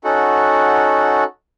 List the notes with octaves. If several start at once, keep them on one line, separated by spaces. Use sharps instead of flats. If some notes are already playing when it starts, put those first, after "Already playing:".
C#4 D#4 F#4 A4 F#5